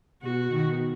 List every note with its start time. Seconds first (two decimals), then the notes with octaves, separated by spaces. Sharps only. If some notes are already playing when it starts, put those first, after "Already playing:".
0.23 B2 F#4
0.51 B2 D#3